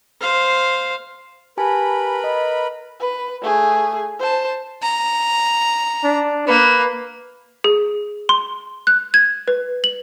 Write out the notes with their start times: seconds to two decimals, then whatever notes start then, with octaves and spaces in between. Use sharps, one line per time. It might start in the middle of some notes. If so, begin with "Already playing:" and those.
0.21 C5 F5
1.57 G4 A#4 B4 G#5 A5 B5
2.24 D#5
3.00 B4
3.42 A3 G#4
4.19 C5 A5
4.83 A#5
6.04 D4
6.47 A#3 B4
7.64 G#4
8.29 C6
8.87 F#6
9.14 G#6
9.48 B4
9.84 F#7